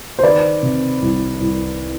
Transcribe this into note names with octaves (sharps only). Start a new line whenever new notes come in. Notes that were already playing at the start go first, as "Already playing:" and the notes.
C5
D#3 B4 D5
C3
C2
C2